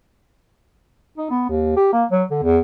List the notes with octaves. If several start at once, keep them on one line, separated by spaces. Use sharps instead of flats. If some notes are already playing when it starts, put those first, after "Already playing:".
D#4
B3
D#2
G4
A#3
F#3
D3
E2